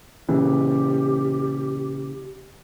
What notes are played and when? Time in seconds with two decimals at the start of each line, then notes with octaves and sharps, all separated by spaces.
0.29 A#2 C#3 E3 G4